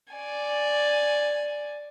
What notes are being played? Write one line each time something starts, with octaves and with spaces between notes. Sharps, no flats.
D5 G#5